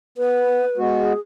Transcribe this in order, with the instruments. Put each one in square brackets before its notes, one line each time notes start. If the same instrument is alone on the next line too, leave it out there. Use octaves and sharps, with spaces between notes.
[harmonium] B3 [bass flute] B4
[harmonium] G#3 B3 F#4
[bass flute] G#4